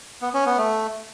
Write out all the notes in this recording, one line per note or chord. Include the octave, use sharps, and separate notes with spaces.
B3
C#4
B3
A3